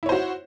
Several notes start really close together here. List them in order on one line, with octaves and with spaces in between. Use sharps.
E4 C#5 C5 F#4